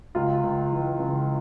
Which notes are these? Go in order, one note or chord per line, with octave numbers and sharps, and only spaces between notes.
C#2 F4
C#2
E3
C#3